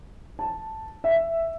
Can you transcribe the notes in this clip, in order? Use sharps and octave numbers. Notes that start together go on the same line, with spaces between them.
A5
E5